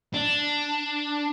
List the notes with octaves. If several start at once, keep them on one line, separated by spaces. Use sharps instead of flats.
D4